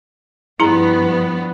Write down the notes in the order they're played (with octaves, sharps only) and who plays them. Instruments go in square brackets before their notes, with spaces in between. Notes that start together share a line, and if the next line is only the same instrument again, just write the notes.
[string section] G2 F3 B3 [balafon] E4 G#4 A#5